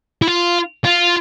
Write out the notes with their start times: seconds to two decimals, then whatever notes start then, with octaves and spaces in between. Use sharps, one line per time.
0.22 E4
0.27 F4
0.85 F4